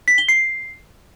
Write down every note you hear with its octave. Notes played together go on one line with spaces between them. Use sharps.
B6
G7
C7